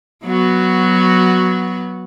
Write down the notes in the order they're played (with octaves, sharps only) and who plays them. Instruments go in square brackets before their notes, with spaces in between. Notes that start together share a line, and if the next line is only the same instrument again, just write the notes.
[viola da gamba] F#3 B3 F#4